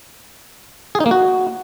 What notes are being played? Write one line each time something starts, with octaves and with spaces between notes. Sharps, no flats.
G#4
D#4
A#3
F#4